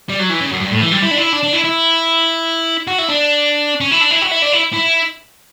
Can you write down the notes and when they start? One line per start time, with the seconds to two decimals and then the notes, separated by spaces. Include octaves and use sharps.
0.09 G3
0.19 F#3
0.29 E3
0.41 C#3
0.51 F#2
0.60 G2
0.71 A2
0.81 E3
0.92 G3
1.02 E4
1.11 D4
1.17 E4
1.32 D4
1.43 D4
1.53 E4
1.64 E4
2.87 F#4
2.98 E4
3.08 D4
3.81 C#4
3.91 E4
4.01 D4
4.11 E4
4.22 F#4
4.31 E4
4.42 D4
4.52 E4
4.73 E4